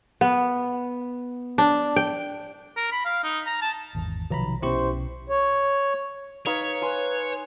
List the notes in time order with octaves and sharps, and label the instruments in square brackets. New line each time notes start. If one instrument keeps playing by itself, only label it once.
[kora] B3
D4
G5
[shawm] A#4
B5
F5
D#4
A#5
A5
[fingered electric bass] G#1 E2
[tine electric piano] B1 A#5 B5 [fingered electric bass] C3 D#3 F3
[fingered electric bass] B1 B3 C#4 [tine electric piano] E4 G4 C#6 [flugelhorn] C5
[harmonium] C#5
[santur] D#4 B4 F5 [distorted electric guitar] C#5
[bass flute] B4 [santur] G#5 C6